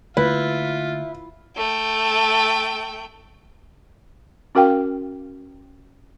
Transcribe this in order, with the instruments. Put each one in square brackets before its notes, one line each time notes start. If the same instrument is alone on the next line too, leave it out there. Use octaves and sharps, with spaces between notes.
[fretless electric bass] D3 A3 A#3 [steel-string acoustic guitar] E4 [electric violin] F4 [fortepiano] B4
[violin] A3 G5
[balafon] C#4 F#4 A#4 F5 G5